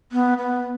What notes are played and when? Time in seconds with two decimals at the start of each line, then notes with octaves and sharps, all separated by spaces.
0.12 B3
0.38 B3